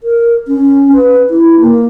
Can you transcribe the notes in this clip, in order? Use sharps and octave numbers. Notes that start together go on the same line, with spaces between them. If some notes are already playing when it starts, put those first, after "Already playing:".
A#4
C#4
B4
E4
A#3